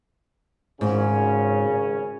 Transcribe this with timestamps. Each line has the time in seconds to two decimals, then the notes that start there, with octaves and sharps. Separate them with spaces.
0.81 G#1 G#2 C#3 C#4